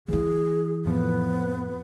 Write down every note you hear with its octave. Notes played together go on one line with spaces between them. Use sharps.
E3 E4 G#4
F2 A2 F3 B3